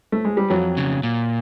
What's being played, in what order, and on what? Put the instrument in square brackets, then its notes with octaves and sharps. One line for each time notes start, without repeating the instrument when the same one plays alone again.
[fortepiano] A3
G#3
G3
[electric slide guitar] F2 [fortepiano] F#3
[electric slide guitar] C#3
A#2